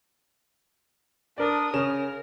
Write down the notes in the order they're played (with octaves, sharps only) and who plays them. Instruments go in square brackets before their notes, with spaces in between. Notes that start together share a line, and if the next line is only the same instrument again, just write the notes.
[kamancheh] D4 D#6 [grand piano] A#4 D5
[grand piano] C#3 C#4 E7 [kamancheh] A#4